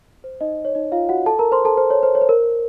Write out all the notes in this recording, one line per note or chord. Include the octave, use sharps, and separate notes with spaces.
C5
D#4 D#5
C#5
D#4 D#5
F4 F5
F#4 F#5
A4 A5
A#4 A#5
C5 C6
A4 A5
C5
C#5
C5
C#5
C5
A#4